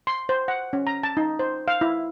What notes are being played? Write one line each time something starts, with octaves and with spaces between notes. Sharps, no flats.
C6
C5
F#5
C#4
A#5
A5
D#4
C5
F5
E4